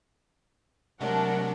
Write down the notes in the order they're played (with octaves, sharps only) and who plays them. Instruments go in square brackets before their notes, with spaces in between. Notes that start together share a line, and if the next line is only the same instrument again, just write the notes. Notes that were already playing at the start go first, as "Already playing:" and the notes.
[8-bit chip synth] C3 G#3 A3 [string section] F#3 D4 [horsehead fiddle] A#4 F#5